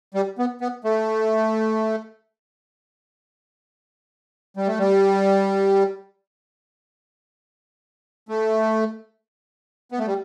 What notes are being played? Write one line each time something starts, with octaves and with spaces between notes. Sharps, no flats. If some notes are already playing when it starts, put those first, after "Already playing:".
G3
B3
B3
A3
G3
A3
G3
A3
B3
A3
G3